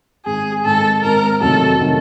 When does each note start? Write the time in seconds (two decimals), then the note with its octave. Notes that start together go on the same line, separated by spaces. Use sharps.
0.26 G#2 D#3 G#3 C4 G#4
0.65 G#2 D#3 G#3 C4 A4
1.02 G#2 D#3 G#3 C4 A#4
1.41 F2 C3 D#3 F#3 A3 A4
1.80 C3 D#3 F#3 A3